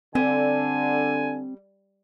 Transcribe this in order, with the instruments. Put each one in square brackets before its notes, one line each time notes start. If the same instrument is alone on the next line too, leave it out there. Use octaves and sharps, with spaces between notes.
[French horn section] D3 [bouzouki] G3 [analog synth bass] C4 [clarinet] G#5